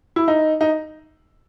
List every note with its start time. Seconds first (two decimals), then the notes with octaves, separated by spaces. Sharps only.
0.16 E4
0.28 D#4
0.61 D#4